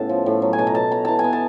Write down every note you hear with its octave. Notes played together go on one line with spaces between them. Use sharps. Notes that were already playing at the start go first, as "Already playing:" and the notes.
Already playing: A2 C#3 B3 A5
F3
A2
F#3
G#5
B2 A5
A#5
B2 A5
B3 A#5
E3 A5
G#5
B3
A5